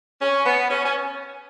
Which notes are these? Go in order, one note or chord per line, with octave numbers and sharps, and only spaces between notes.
C#4
B3
C#4
C#4